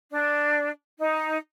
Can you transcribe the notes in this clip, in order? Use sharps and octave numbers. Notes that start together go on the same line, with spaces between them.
D4
D#4